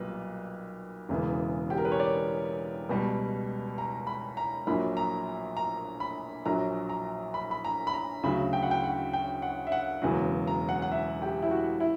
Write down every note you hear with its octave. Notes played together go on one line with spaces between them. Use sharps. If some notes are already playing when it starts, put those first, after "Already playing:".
Already playing: B1 A#2 G3 B4
E1 E2 C#3 E3
G4
A#4
B4
C#5
D5
C#2 B2 G3
A#5
B5
A#5
A#1 A#2 F#3 B5
A#5
A#5
B5
A#1 A#2 F#3 A#5
A#5
B5
B5
A#5
B5
A#5
D2 C#3 F#3 B5
G5
F#5
G5
F#5
G5
F#5
E5
F#5
E1 E2 C#3 F#3
A#5
F#5
F#5
E5
G4
E4
F#4
E4